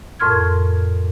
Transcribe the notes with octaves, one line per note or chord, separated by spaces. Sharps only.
F2 A2 A#4 C6 F6 G#6